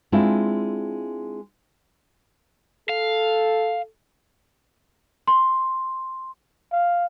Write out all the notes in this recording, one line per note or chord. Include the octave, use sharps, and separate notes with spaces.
G#3 C4 D4 E4 F4
A4 F5
C6
F5